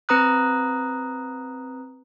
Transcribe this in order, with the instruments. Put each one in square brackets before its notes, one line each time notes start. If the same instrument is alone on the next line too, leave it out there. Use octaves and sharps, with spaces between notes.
[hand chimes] C4 B4 A#5 D#6 F#6